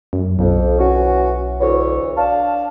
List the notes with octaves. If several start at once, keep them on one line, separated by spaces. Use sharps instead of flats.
F#2
B1 F2
E3 C#4 F#4
D2 E3 C#5
D4 F5 A5